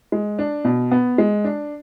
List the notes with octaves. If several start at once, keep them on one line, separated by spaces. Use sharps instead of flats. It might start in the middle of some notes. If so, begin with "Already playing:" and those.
G#3
D4
B2
B3
G#3
D4